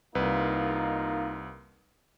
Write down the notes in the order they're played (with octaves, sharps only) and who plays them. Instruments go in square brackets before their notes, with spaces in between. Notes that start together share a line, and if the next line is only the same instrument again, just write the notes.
[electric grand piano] C2 B4 [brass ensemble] A#3 D#4 F4